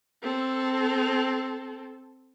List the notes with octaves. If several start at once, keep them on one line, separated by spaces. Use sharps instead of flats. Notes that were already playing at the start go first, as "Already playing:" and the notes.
C4 A4